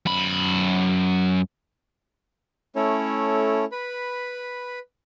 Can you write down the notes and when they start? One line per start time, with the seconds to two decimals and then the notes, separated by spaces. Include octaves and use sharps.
0.06 F#2 B5
2.76 A3 C#4 E4 A4 C#5
3.72 B4 B5